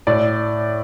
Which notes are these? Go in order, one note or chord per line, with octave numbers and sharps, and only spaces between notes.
A2 D5